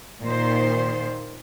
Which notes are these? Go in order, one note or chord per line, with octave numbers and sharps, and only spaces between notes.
A#2 D#3 C5